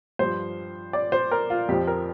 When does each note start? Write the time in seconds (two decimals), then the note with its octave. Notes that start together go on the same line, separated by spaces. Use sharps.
0.19 G2 F3 C5
0.93 D5
1.12 C5
1.31 A#4
1.50 F4
1.69 F2 F3 G4
1.87 A#4